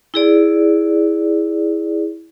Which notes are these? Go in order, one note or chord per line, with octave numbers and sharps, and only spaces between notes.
E4 G#4 D5